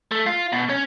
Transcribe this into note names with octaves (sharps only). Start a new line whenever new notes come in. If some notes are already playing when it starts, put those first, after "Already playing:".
A3
F4
B2
C#4